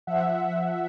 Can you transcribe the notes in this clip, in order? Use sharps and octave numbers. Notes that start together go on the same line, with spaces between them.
F3 E5 F#5
F3